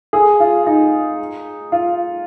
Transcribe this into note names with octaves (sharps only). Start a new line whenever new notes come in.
G#4
F4
D#4
F4